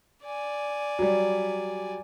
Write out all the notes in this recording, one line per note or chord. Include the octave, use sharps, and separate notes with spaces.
D5 G#5
F#3 G3